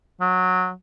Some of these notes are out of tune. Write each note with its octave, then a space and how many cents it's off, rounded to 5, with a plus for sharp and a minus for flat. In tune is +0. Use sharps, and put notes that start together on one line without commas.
F#3 -15